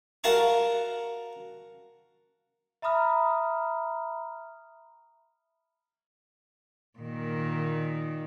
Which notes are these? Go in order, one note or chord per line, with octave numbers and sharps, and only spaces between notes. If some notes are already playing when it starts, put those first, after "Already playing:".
F#4 A#4 F5 A5 C#6
E5 A#5 B5 D#6 F6
A#2 D#3